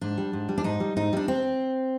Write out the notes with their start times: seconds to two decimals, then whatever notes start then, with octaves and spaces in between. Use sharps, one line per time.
0.01 G#2 D4
0.18 G3
0.33 G#2
0.49 G3
0.58 D4
0.64 G#2 D#4
0.80 G3
0.96 G#2 D#4
1.13 G3 D4
1.28 C4